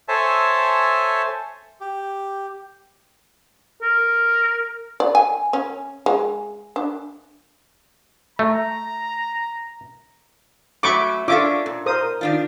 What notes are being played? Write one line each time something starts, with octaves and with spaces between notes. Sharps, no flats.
A4 C5 C#5 E5 G#5 A5
G4
A#4
D5
G#5
C#4
G#3
D4
A3 A#5
F#3 A3 C#4 B5 C#6 D6
C#4 D4 F4 A4 E5 D6
A#2
A#4 C5 D#6
D#3 D4 F4